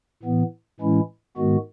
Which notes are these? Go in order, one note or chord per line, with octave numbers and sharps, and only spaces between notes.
A2 E3 B3
A2 E3 G#3 C#4 E4
G#2 D#3 G#3 B3 F#4